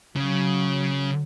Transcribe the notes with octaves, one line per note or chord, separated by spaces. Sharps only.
C#3 F#3